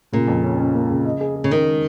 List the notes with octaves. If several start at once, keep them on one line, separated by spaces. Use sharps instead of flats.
A#2 C#3
F2
C#4
C#4
A#3
C#3
D#5
G#4
G#4
C#3
D#3 C#4
G#3